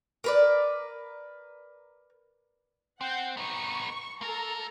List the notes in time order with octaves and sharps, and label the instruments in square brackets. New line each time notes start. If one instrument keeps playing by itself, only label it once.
[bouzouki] A#4 B4 D5
[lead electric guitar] C4 [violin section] F#5 G6
[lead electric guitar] B3 D#4 [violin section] C#6
[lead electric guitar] A#3 A#4 [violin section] A4 A#5